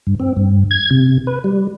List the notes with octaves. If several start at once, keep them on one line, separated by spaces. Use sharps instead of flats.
G2
C4
G2
G#6
C3
B4
G3